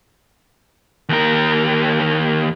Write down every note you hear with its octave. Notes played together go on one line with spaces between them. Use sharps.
D#2 A#4